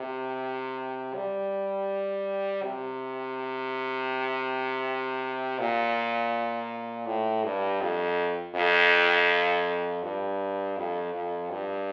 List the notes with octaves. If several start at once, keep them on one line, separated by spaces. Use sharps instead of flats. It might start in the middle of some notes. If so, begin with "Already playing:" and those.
Already playing: C3
G3
C3
A#2
A2
G2
F2
F2
G2
F2
F2
G2